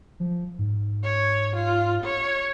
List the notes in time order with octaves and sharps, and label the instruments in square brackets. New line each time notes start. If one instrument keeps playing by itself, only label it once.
[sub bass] F3
G#2
[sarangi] C#5
F4
C#5